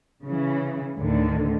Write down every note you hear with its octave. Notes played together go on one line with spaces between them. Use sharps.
C#3 E3
D2 A2 D3 D#3